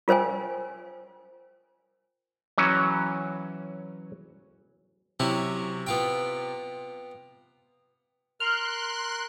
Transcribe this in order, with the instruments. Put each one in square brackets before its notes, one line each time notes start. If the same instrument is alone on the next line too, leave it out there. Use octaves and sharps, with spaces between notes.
[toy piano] F4 A#4 C5 G5 G#5
[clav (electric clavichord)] E3 F#3 C#4
[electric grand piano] C3 [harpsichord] F#3 C#4 E4
[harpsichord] B3 F4 G5
[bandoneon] A#4 [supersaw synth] C6 F#6 [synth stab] F6